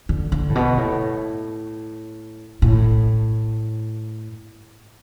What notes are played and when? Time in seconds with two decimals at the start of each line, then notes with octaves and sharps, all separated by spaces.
0.09 D3
0.32 D3
0.50 A2
0.55 B2
0.77 A2
2.62 A2